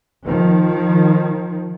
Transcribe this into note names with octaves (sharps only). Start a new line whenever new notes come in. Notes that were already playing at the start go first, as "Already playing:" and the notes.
D#3 F3